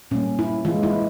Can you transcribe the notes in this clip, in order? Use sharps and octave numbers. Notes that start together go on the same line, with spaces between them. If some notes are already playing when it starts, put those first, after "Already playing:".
A#2 G3 A#3 C#4
E4
E3 G#3 F4
E4